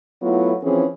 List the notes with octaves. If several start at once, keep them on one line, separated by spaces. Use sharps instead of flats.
F#3 A3 B3 E4 F4
E3 F3 C4 C#4 G#4